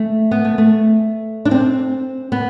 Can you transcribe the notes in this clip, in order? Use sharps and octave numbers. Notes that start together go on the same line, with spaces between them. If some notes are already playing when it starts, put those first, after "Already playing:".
Already playing: A3
B3
A3
A3
D4
C4
B3